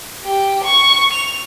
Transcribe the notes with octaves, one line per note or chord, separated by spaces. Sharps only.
G4
C#6
F7